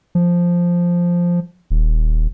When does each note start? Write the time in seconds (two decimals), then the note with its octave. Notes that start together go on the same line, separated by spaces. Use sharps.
0.15 F3
1.71 D#1